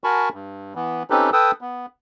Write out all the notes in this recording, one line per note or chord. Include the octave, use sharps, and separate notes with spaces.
F#4 A#4 G#5 A5 B5 C#6
G2
E3 B3
C4 C#4 D#4 G4 A4 B4
A4 B4 G5 D#6 E6
B3